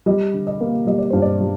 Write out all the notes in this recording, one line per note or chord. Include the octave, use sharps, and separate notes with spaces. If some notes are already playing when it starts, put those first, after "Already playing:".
G3 D#5
D3
D#5
A#3
G3 D#5
D5
G2 C5
D5
G3